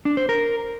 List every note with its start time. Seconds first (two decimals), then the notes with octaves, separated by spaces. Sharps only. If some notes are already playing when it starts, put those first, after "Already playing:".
0.05 D4
0.17 C5
0.29 A#4